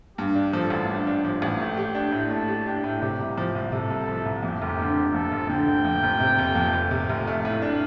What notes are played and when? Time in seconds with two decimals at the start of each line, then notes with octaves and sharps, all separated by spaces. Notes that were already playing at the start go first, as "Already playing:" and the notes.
0.17 G2 G4
0.35 D4
0.53 F3 A4
0.70 A1
0.88 G2 G4
1.07 D4
1.24 F3 G4
1.42 A1
1.59 A3 G5
1.77 G4
1.95 D4
2.12 A2
2.30 A3 A5
2.48 G4
2.67 D4 G5
2.84 A2
3.02 C3 G4
3.19 C2
3.38 F3
3.55 C2
3.72 C3 A4
3.90 C2
4.08 F3
4.25 C2
4.43 F2 G4
4.62 F1
4.79 D3
4.97 F1
5.14 F2 A4
5.32 F1
5.49 D3 G5
5.67 F1
5.85 F2
6.03 F1
6.20 C3
6.39 F1
6.56 F2
6.73 F1
6.91 C3
7.10 F1
7.27 A3 F5
7.45 A2
7.62 D4